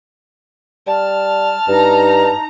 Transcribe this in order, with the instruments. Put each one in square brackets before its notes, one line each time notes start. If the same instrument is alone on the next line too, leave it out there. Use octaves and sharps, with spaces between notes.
[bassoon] G3 [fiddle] A5 F6
[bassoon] G2 [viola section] D#4 A#5